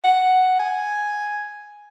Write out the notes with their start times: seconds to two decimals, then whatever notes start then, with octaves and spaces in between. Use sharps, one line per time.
0.04 F#5
0.59 G#5